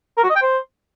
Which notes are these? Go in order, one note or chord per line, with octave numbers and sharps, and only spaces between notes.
A#4
F#4
D#5
G5
C5